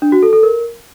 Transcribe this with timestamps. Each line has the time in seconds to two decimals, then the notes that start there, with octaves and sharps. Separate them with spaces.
0.02 D4
0.12 F#4
0.23 A4
0.33 A4
0.43 A#4